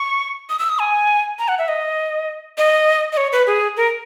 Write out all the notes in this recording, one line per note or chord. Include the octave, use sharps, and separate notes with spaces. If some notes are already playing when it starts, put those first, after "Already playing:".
Already playing: C#6
D#6
E6
D#6
G#5
A#5
F#5
E5
D#5
D#5
D#5
C#5
B4
G#4
A#4